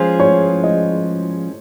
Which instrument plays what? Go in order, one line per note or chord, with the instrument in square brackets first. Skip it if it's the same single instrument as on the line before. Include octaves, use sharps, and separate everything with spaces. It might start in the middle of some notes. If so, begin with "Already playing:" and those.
Already playing: [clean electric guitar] F3 G#3 C#4 F4 G#4 [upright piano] C5
[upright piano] C#5
D#5